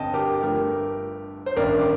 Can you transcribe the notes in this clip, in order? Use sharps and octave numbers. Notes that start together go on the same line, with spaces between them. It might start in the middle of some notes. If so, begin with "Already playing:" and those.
Already playing: G1 F2 C3 D#5 G5 A5
G4 A#4
G2 F3 A3 G4 A#4
C5
A1 G2 D#3 A#3 D4 A#4 D5
D6